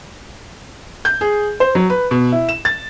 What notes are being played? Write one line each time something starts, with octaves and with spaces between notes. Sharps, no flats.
G6
G#4
C5
F#3
B4
B2
E4
E7
A6